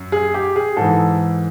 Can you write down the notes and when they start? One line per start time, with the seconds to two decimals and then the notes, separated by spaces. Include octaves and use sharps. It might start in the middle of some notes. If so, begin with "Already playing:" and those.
Already playing: F#2
0.12 G#4
0.34 G4
0.56 G#4
0.76 G#2 E3 A4